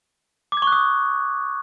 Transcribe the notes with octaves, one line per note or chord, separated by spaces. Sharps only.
D6
G#6
C#6
F#6
D#6